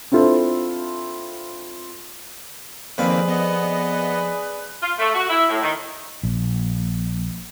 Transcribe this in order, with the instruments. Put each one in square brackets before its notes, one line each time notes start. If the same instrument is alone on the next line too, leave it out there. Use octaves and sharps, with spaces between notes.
[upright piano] C4 D4 E4 F4 A4 C5
[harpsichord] F2 F5 [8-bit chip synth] D#3 A#3 C4 [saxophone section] G#4 B4 D5
[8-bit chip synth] B3 D#5
[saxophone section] F4
A3
F#4
E4
A2
D#3
[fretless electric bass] A#1